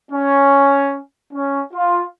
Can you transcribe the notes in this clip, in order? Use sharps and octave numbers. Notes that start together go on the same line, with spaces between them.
C#4
C#4
F4